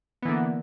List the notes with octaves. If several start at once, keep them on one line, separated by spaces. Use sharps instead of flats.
D3 E3 A#3 B3